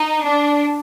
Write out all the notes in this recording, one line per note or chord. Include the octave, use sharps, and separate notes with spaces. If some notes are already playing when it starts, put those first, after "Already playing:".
Already playing: D#4
D4